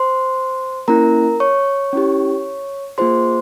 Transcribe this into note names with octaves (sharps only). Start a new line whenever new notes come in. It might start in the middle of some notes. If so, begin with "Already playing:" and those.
Already playing: C5 C6
A#3 C#4 E4 A#4 A#5
C#5 C#6
C#4 E4 G4
A#3 F4 G#4 C5 C6